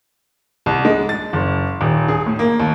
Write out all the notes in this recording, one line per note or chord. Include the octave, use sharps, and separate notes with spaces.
C2
G#3
A6
F#1
D#1
G#4
A2
A#3
D#2